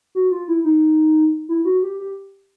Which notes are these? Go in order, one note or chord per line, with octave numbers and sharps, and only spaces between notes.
F#4
F4
E4
D#4
E4
F#4
G4
G4